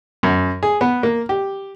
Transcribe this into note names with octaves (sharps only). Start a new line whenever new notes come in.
F#2
G#4
B3
A#3
G4